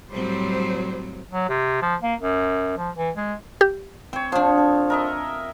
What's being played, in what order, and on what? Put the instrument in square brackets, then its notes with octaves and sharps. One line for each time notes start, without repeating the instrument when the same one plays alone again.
[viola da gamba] A2 F#3 C4 [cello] G3 C5
[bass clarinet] F#3
C3
F3
A#3
F#2
F3
E3
G#3
[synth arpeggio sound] G4
[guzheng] C4 [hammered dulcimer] C#5 G5
[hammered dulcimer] F3 [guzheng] D4 C5
[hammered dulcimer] A4
A#4 D#5 E5